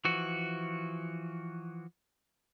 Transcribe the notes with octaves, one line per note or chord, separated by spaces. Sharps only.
E3 F3 F#4